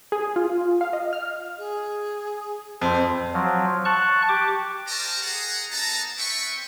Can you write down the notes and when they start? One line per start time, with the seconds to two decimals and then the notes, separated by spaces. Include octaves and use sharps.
0.12 G#4
0.36 F4
0.81 F5
0.93 D#5
1.13 F6
1.58 G#4
2.81 F2 C5
3.34 F3 F#3
3.85 A5 C#6 F#6
4.29 G4 D6
4.87 A#4 C5 D#5 G5 A5 A#5
5.23 G#4 F#5 A#5
5.71 B3 D#4 A4 A5 A#5
6.17 C4 B4 E5 G5 C#6